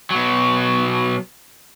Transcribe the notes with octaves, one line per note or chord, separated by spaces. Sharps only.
B2 F#3